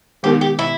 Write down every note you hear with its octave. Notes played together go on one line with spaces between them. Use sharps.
D#3 G#3 B3 D#4 G4 A#4
G4
E4